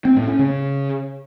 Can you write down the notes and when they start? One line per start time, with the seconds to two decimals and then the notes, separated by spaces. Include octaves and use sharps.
0.05 C4
0.16 A2
0.28 C#4
0.39 C#3